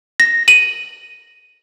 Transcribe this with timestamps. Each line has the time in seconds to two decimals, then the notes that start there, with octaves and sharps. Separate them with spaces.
0.20 A#6
0.48 D#7 F#7